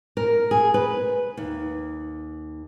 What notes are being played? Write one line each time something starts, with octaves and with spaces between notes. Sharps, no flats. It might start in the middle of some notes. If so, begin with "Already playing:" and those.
A#4
G#4
B4
D#2